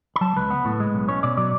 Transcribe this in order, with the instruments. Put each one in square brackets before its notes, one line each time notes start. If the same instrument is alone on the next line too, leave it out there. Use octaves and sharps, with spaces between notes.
[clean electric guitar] B5
F#3 A5
C#2 B4
B3
A2
G#3
B1
C#4 C#5
B2 D5
F#3 D5